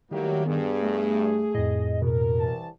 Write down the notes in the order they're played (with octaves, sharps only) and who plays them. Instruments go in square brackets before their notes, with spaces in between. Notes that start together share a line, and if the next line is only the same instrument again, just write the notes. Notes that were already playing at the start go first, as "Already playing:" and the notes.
[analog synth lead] D#3 [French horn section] F#3 E4 G4 [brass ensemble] G3 A3 A#3
[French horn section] G2 [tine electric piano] B3 [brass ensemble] G#4
[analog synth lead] A3
[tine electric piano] F2 A2 [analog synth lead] D#5
[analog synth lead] B2 [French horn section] A#4
[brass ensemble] C2 E3 A5